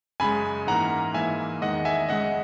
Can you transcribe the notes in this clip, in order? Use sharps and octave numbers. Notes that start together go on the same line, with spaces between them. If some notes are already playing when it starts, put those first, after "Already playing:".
F#2 C#3 G#3 G#5 B5
G#2 E3 A#3 F#5 A#5
G#2 E3 A#3 E5 G#5
E2 D#3 G#3 D#5 F#5
E5 G#5
F#2 C#3 G#3 D#5 F#5